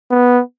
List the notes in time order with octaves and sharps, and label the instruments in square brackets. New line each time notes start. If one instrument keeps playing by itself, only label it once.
[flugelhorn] B3